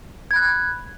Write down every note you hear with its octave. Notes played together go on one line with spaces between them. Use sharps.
B5 F#6 G#6